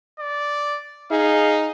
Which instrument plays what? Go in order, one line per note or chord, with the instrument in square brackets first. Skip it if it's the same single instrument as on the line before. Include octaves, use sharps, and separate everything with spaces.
[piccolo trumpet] D5
[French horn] D#4 [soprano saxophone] G#4 [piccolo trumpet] F5